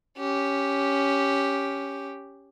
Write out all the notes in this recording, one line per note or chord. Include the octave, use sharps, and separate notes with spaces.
C#4 G4